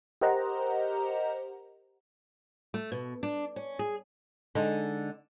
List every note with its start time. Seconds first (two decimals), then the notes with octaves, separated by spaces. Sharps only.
0.21 G4 A#4 C5 D#5 F#5 A#5
2.74 A3
2.92 B2
3.23 D4
3.56 C#4
3.79 G#4
4.55 D3 G#3 D#4